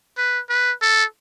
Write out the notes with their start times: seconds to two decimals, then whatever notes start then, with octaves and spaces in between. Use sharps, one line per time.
0.17 B4
0.49 B4
0.82 A4